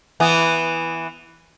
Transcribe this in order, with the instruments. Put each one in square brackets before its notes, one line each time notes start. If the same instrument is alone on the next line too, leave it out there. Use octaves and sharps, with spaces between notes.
[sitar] E3 B3